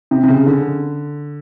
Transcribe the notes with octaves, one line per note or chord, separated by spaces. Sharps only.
C3
C3
C#3
D3